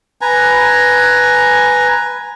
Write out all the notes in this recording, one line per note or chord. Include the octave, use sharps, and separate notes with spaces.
B4 G#5 A#5